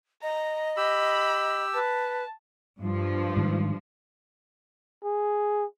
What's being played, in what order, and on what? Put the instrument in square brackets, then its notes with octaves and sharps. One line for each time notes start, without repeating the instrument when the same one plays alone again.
[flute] D#5 [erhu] A#5
[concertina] G4 E6 [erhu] B5
[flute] B4 [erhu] A5
[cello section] G2 F3
[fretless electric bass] G#2 D#3
[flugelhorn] G#4